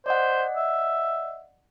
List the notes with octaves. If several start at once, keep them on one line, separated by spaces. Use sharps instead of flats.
C5 D5 D#5 F#5
E5